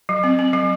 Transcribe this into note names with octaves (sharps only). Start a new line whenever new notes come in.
F#3
C4
C4
F#3